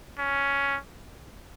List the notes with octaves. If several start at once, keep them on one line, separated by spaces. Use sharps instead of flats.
C#4